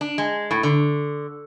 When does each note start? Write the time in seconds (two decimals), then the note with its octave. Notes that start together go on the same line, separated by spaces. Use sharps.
0.01 D4
0.18 G#3
0.51 A2
0.63 D3